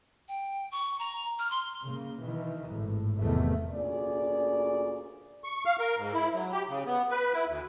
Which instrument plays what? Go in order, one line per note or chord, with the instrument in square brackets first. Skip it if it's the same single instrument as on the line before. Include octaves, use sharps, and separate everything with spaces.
[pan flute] G5
C#6
A#5
F6
C6
[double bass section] C#3 A#3
B2 D#3 E3
G#1 A2
F1 E2 C3 D#3 A3
[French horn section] D2 A#2 C#4 G#4 D5
[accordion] C#6
F5
A#4
G#2
E4
F#3
G4
C#3
B3
B4
E4
D2